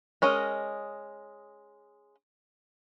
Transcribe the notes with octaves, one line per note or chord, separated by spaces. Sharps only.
G#3 C#4 A#4 D#5